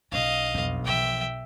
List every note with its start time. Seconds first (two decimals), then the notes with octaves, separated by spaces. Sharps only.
0.12 B1 C#4 D#5 F5
0.54 B1 F2 D4
0.85 E3 F3 E5 G5